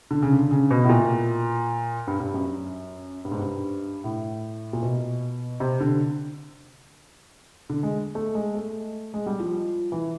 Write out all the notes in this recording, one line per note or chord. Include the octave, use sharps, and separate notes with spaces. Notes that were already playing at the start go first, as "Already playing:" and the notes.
D3
C#3
D3
C#3
B2
A2
A#2
G2
G2
F#2
G2
G#2
G2
A2
A#2
B2
C3
D3
D3
G#3
A3
G#3
A3
G#3
G3
F3
E3